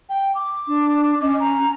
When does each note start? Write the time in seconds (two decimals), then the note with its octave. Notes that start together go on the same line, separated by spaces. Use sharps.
0.09 G5
0.35 D6
0.68 D4
1.22 C#4 D#5
1.40 A#5